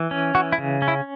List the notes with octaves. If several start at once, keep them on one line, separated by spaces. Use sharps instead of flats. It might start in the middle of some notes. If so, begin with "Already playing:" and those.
Already playing: E3
C#4
E3 F#4
E4
C#3
C#4
E4